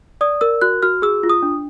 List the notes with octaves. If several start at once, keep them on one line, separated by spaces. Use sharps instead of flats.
D5 D#6
A#4 E6
F#4 F#6
F#4 F6
G#4 E6
F4
D#6
D4